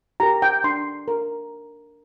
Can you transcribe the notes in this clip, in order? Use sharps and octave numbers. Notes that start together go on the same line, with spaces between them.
G4 A#4 A#5
G5
D4 C6
A#4